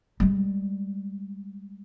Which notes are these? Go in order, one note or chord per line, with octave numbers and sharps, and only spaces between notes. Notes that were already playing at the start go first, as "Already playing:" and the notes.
G3 G#3